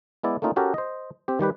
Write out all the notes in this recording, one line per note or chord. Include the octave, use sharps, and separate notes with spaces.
G#3 B3 E4 D5
A3 A#3 C#4 D#4 F4
C#4 F#4 G4 A4 A#4
C5 D#5
C4 G4
D#3 G3 G4 B4